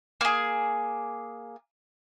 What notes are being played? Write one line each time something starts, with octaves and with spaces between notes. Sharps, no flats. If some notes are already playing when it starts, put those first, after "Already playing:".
A#3 G#4